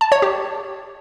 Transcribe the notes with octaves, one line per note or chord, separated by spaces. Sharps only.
A5
C#5
G4